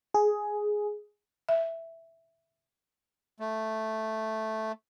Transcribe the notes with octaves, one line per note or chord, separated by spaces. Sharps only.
G#4
E5
A3